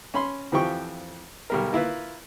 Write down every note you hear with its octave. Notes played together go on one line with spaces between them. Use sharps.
C#4 B5 C6
F2 E3 F3 G4 G5 C#6
B1 G3 A#4
A#3 E4 F4 B4